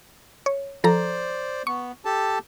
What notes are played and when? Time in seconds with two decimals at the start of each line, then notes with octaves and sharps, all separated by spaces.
0.46 C#5
0.84 F3 A4 C5 D5 A#5
1.67 B3 C#6
2.05 G4 A4 A5